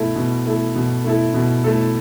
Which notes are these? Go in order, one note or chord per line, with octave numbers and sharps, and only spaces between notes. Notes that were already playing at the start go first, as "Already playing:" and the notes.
Already playing: B2 A3 E4 A4
B2
A3 E4 A4
B2
A3 E4 A4
B2
A3 E4 A4